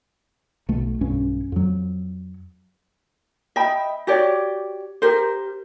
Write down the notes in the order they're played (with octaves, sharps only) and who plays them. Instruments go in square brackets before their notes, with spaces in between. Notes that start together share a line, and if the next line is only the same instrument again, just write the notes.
[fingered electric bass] B1 A3
B1 G2 C#4
F2 F#3
[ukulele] D#5 E5 G5 B5
F#4 G4 C#5 D5
G4 A#4 C5